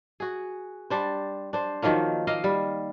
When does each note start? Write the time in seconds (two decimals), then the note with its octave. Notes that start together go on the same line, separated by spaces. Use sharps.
0.20 F#4 G#4
0.90 G3 D4 C5
1.53 D4 C5
1.82 D#3 F3 F#3 A#3
2.27 A#3 D#5 F5
2.44 G3